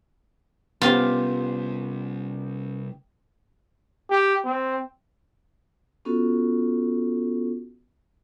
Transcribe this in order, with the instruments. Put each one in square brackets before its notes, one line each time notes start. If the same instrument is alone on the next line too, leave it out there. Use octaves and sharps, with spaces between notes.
[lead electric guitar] C2 [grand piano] B3 G4 [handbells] C#4 [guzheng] F4
[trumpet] G4
C4
[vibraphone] B3 C#4 F4 F#4 A4